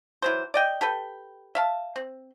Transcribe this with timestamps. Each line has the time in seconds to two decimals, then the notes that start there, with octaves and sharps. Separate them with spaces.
0.22 E3 F#3 C5
0.54 D5 D#5 G5
0.81 G4 A4 B4 G5
1.55 E5 F5 A5
1.96 C4